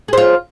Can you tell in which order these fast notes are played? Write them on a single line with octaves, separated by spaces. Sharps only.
G#4 C5 F4